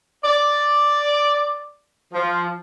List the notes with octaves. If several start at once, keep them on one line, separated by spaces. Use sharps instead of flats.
D5
F3